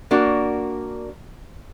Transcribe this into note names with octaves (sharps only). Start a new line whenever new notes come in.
A#3 D4 F#4 A#4